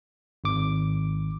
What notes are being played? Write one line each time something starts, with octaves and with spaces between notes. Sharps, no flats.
G#1 D6